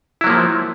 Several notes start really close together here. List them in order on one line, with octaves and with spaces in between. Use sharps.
E4 F#3 A#3 F3